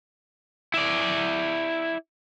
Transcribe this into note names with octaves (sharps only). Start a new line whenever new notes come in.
E4 D5